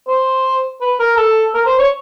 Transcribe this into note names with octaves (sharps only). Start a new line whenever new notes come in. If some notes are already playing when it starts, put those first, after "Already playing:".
C5
B4
A#4
A4
A#4
C5
C#5